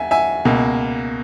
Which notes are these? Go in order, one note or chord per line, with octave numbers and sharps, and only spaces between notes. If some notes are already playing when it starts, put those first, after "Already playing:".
Already playing: D#2 E5 G#5
E5 G#5
C#2 B2 A#3